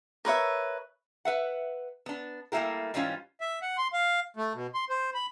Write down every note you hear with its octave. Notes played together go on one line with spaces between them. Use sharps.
A#4 B4 C#5 E5
B4 E5 F#5
B3 D4
G3 A3 A#3 E4 G4 A#4
G#2 E3 G3 C#4 F4
E5
F#5
C6
F5
A3
B2
C6
C5
B5